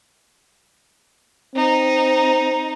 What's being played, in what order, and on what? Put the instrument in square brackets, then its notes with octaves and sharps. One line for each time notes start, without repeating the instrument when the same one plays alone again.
[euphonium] C4 [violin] D#4